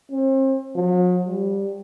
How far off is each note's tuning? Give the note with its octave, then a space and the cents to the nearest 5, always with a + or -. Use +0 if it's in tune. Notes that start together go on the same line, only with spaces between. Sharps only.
C4 +40
F#3 -45
G3 +5